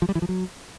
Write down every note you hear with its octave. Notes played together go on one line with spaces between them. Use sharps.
F3
G3
E3
F3
F#3